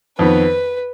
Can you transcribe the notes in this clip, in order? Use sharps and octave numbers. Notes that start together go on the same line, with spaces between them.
F2 D#3 B3 B4